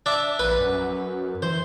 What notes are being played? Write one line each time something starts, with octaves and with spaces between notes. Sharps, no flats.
D4 E5
A#1 B4
F#2
E3 C5